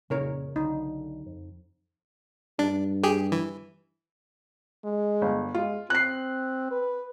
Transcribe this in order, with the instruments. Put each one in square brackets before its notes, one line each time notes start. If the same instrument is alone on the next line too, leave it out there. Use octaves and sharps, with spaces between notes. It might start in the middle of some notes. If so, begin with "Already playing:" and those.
[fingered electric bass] F2 A#2 [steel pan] C#3 A#4 C#5
[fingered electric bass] B1 D3 D4 [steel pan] D#4
[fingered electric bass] F2
[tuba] G2 [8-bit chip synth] D4
[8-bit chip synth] G4 G#4
E3
[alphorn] G#3
[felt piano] G1
[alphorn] G#3 [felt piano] F4
[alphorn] C4 [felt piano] F#6 C7
[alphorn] B4